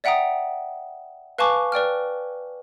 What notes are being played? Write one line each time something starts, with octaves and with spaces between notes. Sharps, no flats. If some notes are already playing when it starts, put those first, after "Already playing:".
D5 E5 F#5 G5 A#5 D#6
B4 F5 G#5 A5 C#6 D6
B4 D5 G5 F6